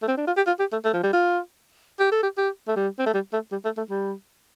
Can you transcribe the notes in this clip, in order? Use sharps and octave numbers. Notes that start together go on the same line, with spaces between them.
A3
C4
D4
F4
G4
F4
G4
A3
A3
F3
G3
F4
G4
A4
G4
G4
A3
G3
C4
A3
G3
A3
G3
A3
A3
G3